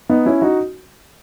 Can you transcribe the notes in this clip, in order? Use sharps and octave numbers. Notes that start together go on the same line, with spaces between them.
B3 D#4
C#4 E4
D#4 F#4